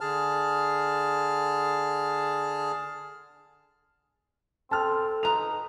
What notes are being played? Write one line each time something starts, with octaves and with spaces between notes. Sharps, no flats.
D3 G#4 A5 F6
C4 A4 A5 F6
D#4 B4 A#5 F7